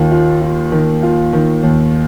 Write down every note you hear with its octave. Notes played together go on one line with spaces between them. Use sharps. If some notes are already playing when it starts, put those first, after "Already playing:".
Already playing: D#2 D#3 F4
F4
F4
D#3
F4
D#3
D#2